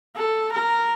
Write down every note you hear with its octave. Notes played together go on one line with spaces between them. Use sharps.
A4
A#4